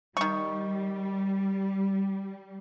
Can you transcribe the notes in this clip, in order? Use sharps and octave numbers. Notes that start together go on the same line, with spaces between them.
D#3 G3 C#6